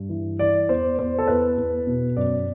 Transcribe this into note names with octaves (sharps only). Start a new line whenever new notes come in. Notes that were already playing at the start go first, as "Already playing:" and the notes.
Already playing: G2
E3
E3 D5
E2 C5
E2 C5
A4
E2 B4
E2
B2
F#2 D5